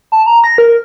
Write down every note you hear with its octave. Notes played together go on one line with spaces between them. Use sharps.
A5
A#5
A#6
A#4